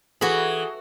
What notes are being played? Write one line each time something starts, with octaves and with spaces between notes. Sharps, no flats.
E3 F#4 G#4 A4 B5